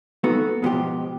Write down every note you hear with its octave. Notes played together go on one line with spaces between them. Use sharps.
A#3 B3 D#4 F#4 A4 B4
G#2 B2 F3 G4